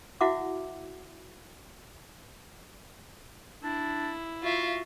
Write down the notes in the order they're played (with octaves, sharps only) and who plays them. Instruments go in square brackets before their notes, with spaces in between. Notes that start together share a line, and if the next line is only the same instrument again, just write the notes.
[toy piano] E4 F#4 E5 F#5 D6
[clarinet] D4 [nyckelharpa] E4
[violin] F4 E5 [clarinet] F#4